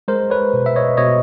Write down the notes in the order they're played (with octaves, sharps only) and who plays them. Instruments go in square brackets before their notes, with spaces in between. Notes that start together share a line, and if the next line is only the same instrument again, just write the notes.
[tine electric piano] G#3 A#4 C5
B4 C#5
B2
E5
C#5 D#5
B2 C#5 D#5